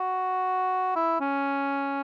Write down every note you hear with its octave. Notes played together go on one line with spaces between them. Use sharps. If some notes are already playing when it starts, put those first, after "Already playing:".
Already playing: F#4
E4
C#4